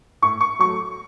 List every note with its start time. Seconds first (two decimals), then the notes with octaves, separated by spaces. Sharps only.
0.22 A2 C#6
0.41 C#6
0.59 F#3 A3 C#6